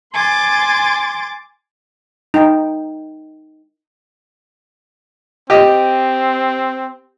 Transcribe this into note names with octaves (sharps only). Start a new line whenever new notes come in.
G#5 C6 D6 A6
D#4 G5
C4 G4 D#5